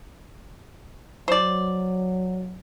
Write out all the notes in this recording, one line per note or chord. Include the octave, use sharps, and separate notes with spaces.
F#3 C5 D5